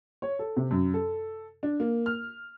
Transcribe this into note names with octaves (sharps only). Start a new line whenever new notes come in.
C#5
A4
C3
F#2
A4
D4
A#3
F6